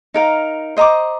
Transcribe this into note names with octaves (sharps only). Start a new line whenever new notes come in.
D#4 A#4 F5
C5 D#5 A#5 D6